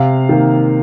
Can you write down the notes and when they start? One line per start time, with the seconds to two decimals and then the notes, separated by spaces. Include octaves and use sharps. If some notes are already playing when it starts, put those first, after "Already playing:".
Already playing: C3 F5
0.29 D#3 A#3